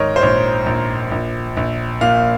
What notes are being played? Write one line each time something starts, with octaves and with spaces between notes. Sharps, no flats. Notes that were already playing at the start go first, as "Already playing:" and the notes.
Already playing: G#2 D#3 A#4 C#5 D#5
C5
A#1 C#5
A#1
A#1
A#1
A#2 F5